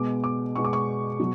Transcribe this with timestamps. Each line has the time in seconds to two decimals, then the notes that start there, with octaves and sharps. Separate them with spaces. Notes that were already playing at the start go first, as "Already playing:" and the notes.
Already playing: B2 G#3 B3 D6
0.24 D6
0.56 B2 G#3 B3 C#6
0.64 D6
0.73 C#6
1.20 B2 F#3